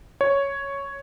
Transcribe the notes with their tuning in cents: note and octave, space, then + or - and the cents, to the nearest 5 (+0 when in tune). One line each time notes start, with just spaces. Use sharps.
C#5 +5